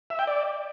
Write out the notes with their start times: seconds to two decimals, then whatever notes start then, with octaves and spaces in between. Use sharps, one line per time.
0.10 E5
0.19 G5
0.27 D5